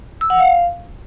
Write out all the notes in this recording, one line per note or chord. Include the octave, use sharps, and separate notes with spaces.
E6
F#5
F5